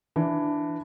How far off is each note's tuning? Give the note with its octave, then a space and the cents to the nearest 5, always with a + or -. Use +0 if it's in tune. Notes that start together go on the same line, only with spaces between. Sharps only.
E3 +15 D4 +0